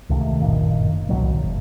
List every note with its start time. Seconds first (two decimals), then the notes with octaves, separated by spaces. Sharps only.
0.09 C#2 C3 D#3 A3
0.40 F#1 G2 A#2 D#3
1.09 C2 B2 D#3 F#3
1.42 F#1